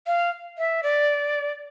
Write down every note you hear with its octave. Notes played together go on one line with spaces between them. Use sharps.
F5
E5
D5